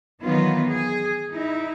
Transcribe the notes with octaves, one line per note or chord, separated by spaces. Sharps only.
D#3 E3 F#3 B3 D#4 F4
G#4
D#4 E4